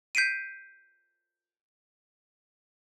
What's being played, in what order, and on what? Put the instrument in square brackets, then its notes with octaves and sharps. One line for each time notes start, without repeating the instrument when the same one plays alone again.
[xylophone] G6 B6 C7 D7 D#7